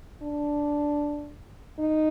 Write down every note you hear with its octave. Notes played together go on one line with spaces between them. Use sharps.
D4
D#4